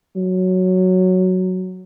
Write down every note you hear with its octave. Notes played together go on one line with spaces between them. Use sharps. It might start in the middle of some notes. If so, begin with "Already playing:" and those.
F#3